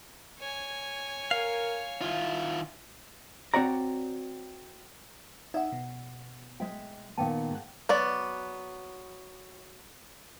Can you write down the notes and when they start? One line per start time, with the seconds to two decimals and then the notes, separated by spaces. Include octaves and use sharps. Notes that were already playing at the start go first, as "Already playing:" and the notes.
0.39 C#5 G#5
1.31 A#4 F5
2.01 D#3 E4 F4
3.54 C4 F#4 C#5 D5 A#5
5.54 D#4 D5 E5 F#5
5.72 B2
6.60 G#3 E5 G5
7.18 A#2 D#3 B3 F5 G5 A5
7.51 G#2 F#5
7.89 F#3 B3 D5